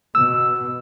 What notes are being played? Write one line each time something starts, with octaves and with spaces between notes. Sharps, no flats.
B2 E6